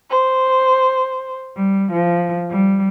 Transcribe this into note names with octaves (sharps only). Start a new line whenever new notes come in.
C5
G3
F3
G3